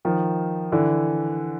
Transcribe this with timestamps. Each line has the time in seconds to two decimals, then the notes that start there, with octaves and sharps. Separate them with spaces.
0.05 D#3 F3
0.72 D3 E3